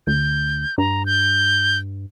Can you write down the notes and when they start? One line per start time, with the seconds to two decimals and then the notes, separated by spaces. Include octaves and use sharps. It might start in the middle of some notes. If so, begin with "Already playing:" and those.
0.07 D2 G6
0.78 G2 A#5
1.06 G6